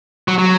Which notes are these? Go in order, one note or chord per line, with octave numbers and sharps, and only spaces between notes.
F#3
F#3